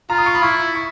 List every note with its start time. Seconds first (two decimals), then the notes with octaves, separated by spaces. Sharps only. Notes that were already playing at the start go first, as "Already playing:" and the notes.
0.10 F4 A#5
0.18 D#6
0.26 C#6
0.35 B5
0.42 E4 C#6
0.75 C#6